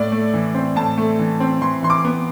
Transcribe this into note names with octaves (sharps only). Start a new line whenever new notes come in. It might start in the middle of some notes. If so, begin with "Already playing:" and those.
Already playing: A2 D5
A3
E3
C4
A2 A5
A3
E3
C4
E3 C6
E3 C6
D6
B3